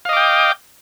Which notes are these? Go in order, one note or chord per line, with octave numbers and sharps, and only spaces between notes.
D#5 F5 G5 D6